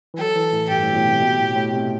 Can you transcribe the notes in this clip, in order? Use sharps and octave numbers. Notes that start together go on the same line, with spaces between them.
E3
F#3 A4
E3
A2
G2 G4
A2
B2
A2
C3
B2
A2
A2
C3